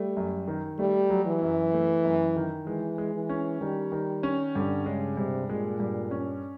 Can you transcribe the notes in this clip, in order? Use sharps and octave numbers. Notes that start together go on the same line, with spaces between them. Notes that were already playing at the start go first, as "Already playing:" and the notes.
Already playing: G3 A3
F#2
D#3
G3 A3
F#3
E3
F#2
A3
F#2
D#3
E3 G#3
G#3
E3
C#4
D#3 G3
D#3
C#4
G2 D3
C#3 G#3
G2 C3
A#2 G#3
G2
C#4